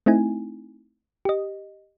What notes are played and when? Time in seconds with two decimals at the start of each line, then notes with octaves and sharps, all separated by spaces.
0.06 A3 C4 D#4 E4 G#5
1.25 G4 D#5